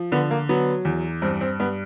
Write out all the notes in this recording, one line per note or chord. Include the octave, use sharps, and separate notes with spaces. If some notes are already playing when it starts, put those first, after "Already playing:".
Already playing: F3
D3 B3
A#3
F#3 B3
E2
G2 C4
C4
G2 B3